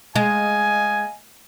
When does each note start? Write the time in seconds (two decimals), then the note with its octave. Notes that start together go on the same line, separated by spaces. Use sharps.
0.16 G#3 D#5 F5 G#5